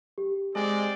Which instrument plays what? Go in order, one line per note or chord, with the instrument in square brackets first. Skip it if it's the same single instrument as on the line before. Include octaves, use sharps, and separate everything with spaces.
[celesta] G4
[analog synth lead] G#3 [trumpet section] C4 D5